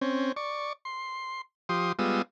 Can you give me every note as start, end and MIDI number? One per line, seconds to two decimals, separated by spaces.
0.01 0.32 60
0.01 0.32 61
0.36 0.73 74
0.36 0.73 85
0.85 1.41 84
1.69 1.92 53
1.69 1.92 67
1.69 1.92 84
1.69 1.92 87
1.99 2.22 55
1.99 2.22 56
1.99 2.22 59
1.99 2.22 65
1.99 2.22 87
1.99 2.22 88